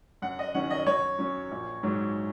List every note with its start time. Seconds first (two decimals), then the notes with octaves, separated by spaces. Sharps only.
0.22 F#2 F#5
0.39 D#5
0.54 D#3 F#3 C#4 F#5
0.70 D#5
0.86 F#2 C#5
1.18 F#3 C#4
1.51 A#1
1.83 G#2 F#3